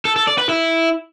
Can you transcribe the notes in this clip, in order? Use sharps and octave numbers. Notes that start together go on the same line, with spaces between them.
A4
A4
D5
B4
E4